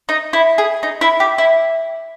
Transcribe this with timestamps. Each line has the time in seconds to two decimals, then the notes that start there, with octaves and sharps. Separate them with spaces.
0.09 D#4
0.33 E4
0.58 G#4
0.83 D#4
1.01 E4
1.20 G4
1.38 E4